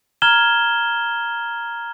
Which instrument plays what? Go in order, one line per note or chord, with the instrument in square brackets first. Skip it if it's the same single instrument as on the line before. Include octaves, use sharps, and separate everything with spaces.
[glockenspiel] A#5 F6 G#6 E7 G7